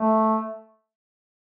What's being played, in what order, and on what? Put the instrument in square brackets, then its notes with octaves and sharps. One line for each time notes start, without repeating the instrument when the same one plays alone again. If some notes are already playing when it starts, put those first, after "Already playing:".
Already playing: [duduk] A3